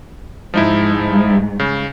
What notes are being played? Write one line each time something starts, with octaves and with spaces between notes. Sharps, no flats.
G#2 F3 D#4 E4
C#3